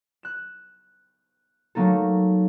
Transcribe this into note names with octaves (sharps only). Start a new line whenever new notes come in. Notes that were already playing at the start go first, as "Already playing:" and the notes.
F#6 E7
F#3 A3 A#3 D#4 A4